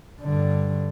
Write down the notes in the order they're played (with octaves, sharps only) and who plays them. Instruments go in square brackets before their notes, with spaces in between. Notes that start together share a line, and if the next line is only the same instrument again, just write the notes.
[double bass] G2 D3